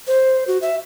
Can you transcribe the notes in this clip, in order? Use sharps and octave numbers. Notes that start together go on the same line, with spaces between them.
C5
F#4
E5